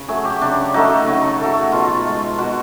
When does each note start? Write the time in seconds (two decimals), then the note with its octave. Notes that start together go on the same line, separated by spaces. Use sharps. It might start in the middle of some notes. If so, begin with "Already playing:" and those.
Already playing: C#3
0.08 F#3 A3 G#4
0.25 G4
0.41 C#3 D4
0.74 F#3 A3 D#4
1.07 C#3
1.40 F#3 A3
1.72 B2 F4
2.05 G#3
2.38 B2 F#4